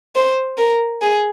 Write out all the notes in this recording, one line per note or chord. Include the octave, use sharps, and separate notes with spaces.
C5
A#4
G#4